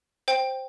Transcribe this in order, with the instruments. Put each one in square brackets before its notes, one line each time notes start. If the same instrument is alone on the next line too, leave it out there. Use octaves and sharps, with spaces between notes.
[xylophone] C5 G5